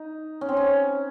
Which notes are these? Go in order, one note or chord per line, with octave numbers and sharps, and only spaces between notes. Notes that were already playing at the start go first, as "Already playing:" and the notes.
Already playing: D#4
C#4
C4
C#4